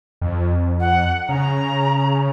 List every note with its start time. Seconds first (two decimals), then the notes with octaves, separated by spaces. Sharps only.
0.21 F2
0.80 F#5
1.29 C#3 A#5